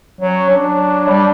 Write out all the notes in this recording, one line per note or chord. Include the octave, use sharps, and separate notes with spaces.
F#3 C#4
F#3 D4
G3